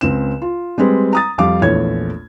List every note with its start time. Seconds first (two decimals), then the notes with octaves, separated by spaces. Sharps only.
0.01 C#2 C4 E7
0.42 F4
0.78 G3 G#3 C4 B4
1.13 A#5 D#6 A6
1.38 F2 G3 F5 D6
1.61 A#1 E2 A3 C#5 G#6